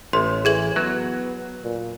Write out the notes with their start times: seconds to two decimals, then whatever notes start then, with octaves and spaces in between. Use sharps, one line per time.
0.13 A1 A2 C6
0.45 E3 G#4 G#6 F#7
0.76 F#3 B3
1.64 A#2